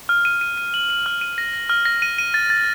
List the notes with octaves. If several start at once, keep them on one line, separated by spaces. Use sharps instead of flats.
F6
D#7
D#7
D#7
F#7
F#7
F6
D#7
A#6
A#6
F6
A#6
D#7
D#7
A6
A6